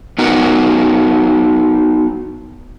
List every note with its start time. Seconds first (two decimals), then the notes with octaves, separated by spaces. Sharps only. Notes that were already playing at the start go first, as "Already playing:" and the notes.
0.18 B3 D#4 F#4 A#4